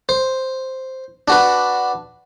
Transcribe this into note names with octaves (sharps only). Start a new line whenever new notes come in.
C5
D4 F#4 B4